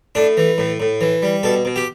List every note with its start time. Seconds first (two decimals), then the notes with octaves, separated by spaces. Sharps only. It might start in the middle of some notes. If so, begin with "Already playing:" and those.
0.15 A2 D4
0.37 E3
0.58 A2
0.80 A2
1.01 E3
1.23 G3
1.43 B2 A4
1.65 B2
1.76 G4